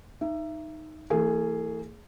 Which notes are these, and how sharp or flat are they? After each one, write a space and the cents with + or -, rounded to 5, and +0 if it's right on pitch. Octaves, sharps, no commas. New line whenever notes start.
D#4 +0 E5 +25
E3 +0 A3 +45 G#4 +0